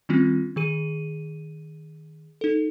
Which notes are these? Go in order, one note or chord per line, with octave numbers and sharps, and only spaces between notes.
D#3 G3 C4 C#4 F4
D#3 G#4 D#7
D#4 A4